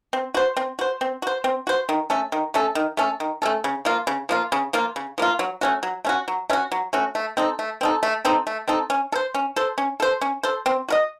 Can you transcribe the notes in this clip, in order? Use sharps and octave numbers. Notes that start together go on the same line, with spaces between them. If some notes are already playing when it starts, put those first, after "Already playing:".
C4
F#4 C5
C4
F#4 C5
C4
F#4 C5
C4
F#4 C5
D#3
A3 C#4 A4
D#3
A3 C#4 A4
D#3
A3 C#4 A4
D#3
A3 C#4 A4
C#3
F3 A#3 F4
C#3
F3 A#3 F4
C#3
F3 A#3 F4
C#3
F3 A#3 F4
F#3
A3 C#4 F#4
F#3
A3 C#4 F#4
F#3
A3 C#4 F#4
F#3
A3 C#4 F#4
A3
C4 D#4 A4
A3
C4 D#4 A4
A3
C4 D#4 A4
A3
C4 D#4 A4
C#4
A4
C5
C#4
A4 C5
C#4
A4 C5
C#4
A4 C5
C4
F#4 A#4 D#5